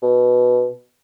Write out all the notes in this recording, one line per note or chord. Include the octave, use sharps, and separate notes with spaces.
B2